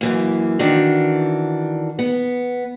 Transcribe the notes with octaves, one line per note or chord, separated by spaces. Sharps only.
F#2 E3 A#3
D#3 E3 D4 F#4
B3